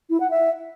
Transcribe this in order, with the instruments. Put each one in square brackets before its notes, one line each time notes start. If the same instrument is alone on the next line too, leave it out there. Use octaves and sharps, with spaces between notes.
[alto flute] E4
F#5
E5